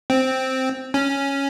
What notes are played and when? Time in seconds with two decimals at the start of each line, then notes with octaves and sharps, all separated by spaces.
0.10 C4
0.94 C#4